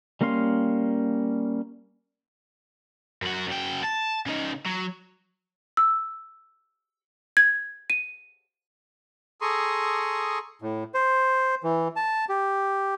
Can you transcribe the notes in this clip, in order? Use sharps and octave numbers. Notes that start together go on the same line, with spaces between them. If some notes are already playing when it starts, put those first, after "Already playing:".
G3 A#3 C#4 F5 C6
F#2 F#4
F#2 G5
A5
C#3 D#4
F#3
E6
G#6
D#7
G#4 A4 A#5 C6 C#6 D#6
A2
C5
E3
A5
G4